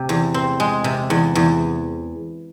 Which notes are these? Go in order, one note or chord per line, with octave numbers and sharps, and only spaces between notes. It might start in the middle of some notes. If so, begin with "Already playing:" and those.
Already playing: C3 C4
E2
C4
G#3
C3
E2
E2